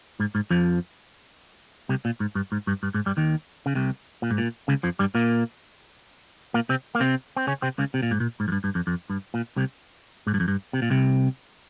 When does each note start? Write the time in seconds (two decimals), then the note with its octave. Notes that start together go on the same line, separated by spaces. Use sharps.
0.20 G#2
0.35 G#2
0.50 F2 F3
1.89 C2 C3
2.05 A#2
2.20 G#2
2.35 G2
2.52 G#2
2.67 G2
2.83 G2
2.94 G#2
3.06 G2 G3
3.17 D#2 D#3
3.66 C#3
3.75 C2 C3
4.22 A#2
4.31 G#2
4.38 A#2
4.68 C#2 C#3
4.83 F2 F3
4.99 G2 G3
5.15 A#2 A#3
6.54 A#2 A#3
6.69 C3 C4
6.95 A#3
7.00 C3 C4
7.37 C4
7.47 C#3 C#4
7.62 C3 C4
7.78 C#2 C#3
7.94 C3
8.02 A#2
8.11 G#2
8.20 A#2
8.40 G#2
8.48 F2
8.52 G2
8.64 G2
8.75 F2
8.87 F2
9.10 G2
9.34 A#2
9.56 C2 C3
10.27 G#2
10.34 G2
10.40 F2
10.48 G2
10.73 C3
10.82 A#2
10.90 C2 C3